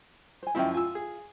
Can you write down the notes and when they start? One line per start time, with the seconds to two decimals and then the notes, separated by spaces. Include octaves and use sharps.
0.43 C5 G#5
0.55 F#2 F3 E4 D#5 E5 G5
0.74 F4 G#5 E6
0.95 G#4